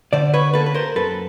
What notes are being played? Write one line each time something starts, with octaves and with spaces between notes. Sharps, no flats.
D3 C5 D5
B4 C#5
A#3 A4 B4
B4
A#4 C5
F#2 A4 B4